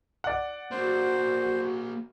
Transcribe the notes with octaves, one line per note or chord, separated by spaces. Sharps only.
D5 F#5
A#3 D4 F#4 C5